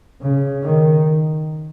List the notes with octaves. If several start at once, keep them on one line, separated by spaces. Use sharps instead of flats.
C#3
D#3